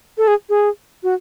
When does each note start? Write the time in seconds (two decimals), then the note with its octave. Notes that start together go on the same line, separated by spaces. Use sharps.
0.18 A4
0.27 G#4
0.49 G#4
1.03 F#4